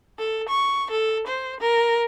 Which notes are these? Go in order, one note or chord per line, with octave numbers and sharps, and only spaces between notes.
A4
C#6
A4
C5
A#4